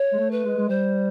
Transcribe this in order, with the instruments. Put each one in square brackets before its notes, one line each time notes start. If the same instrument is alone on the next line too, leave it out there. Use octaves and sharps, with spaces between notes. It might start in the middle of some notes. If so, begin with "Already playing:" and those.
Already playing: [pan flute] C#5
[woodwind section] G#3
A3
[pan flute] B4
[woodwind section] G#3
G#3
[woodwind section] G3 [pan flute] C5